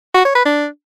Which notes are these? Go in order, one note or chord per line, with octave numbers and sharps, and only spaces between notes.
F#4
C#5
B4
D4